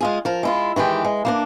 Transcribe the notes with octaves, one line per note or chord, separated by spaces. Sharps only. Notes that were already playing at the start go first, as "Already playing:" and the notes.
G#3 F4 G#4
F3 A#4
G#3 E4 F4
D#3 E3 G#3 G4
G#3
A#3 B3 D4